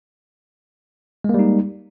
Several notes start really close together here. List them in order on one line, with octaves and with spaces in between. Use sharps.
G#3 A#3 G3 D#4